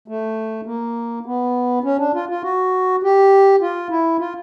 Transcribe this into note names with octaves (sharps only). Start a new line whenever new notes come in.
A3
A#3
B3
C#4
D4
F4
F4
F#4
G4
F4
E4
F4